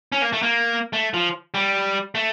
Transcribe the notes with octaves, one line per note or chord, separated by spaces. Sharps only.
C#4
A#3
A3
A#3
A3
F3
G3
A3